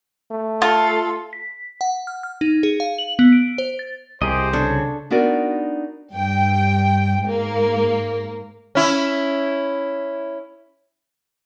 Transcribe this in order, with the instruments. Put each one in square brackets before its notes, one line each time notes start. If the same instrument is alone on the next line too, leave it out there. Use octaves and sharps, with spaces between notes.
[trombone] A3
[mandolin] F4 [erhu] A4
[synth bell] B6
F#5
F6
F6
D#4
G#4
F5
F#7
B3
D7
C5
A6
[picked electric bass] C2 [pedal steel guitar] G4 G#4 D#5 [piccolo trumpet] C5
[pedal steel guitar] C#3 C#5 [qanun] D4 A4
[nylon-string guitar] B3 D4 D#4 F#4 A#4 D5
[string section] G2 G5
G#2 A#3
[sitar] C#4 E4